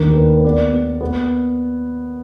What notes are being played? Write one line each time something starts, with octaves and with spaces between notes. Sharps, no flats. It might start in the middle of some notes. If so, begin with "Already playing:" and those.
Already playing: D#2 D#3 D4 A#4
A#4
A#3 B4
B4
B3 D5
B3
B3